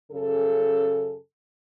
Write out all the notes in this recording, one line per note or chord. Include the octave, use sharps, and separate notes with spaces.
F#2 C#3 G#4 A4